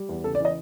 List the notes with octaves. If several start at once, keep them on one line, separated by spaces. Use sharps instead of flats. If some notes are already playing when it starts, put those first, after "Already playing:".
Already playing: G3
E2
C#3 A4
D5
E3 D#5